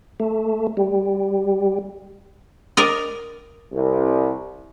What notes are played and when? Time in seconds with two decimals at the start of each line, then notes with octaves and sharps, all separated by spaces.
0.20 A3
0.77 G3
2.77 A#4 D5 D#5
3.72 C2